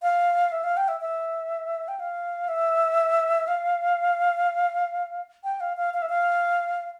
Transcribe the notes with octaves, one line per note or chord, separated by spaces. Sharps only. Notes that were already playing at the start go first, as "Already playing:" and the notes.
F5
E5
F5
G5
E5
E5
G5
F5
E5
F5
G5
F5
F5
F5
E5
F5